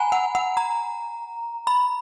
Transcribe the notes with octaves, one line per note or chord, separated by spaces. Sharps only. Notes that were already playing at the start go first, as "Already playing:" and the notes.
Already playing: F#5 G#5 A#5 B5
F#5
F#5
A#5
B5